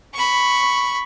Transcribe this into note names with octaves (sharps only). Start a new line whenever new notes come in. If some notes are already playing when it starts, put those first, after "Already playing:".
B5 C#6